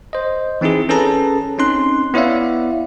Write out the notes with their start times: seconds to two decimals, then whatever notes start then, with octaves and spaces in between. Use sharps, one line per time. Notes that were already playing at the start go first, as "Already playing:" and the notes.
0.13 C5 D#5
0.61 E3 C4 D#4 E4 G#4
0.89 C#4 G#4 A4 B4 A5 A#5
1.58 C4 C#4 D#4 C6 F#6
2.14 B3 E4 C#5 D5 E5 F5